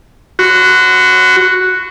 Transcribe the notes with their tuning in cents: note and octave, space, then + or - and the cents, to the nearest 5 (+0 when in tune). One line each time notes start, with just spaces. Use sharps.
F#4 +0 C6 -45